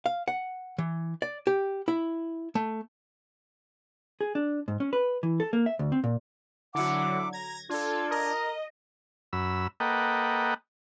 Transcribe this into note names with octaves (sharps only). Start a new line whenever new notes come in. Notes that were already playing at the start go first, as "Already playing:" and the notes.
F5
F#5
E3
D5
G4
E4
A3
G#4
D4
G#2
C#4
B4
E3
A4
A#3
E5
D2
C4
A#2
D3 F#3 E4 F#5 D6
A#5 G#6 A#6
D4 F4 A4 G#6
A#4 D#5
F#2 B5 E6
A#3 A4 B4 D#5 F#5 G5